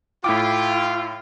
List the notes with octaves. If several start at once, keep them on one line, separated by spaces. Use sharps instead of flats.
A2 E4 F4 G5 D6